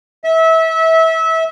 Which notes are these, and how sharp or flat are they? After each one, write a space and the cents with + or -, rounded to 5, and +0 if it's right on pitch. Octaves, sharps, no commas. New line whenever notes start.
E5 -25